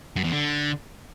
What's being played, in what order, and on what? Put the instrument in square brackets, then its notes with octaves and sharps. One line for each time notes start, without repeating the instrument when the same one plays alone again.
[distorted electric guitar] F#2
E2
D3